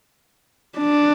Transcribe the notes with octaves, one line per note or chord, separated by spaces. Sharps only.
D4